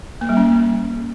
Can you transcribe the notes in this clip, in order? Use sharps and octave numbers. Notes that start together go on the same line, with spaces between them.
A#3
G3
C#4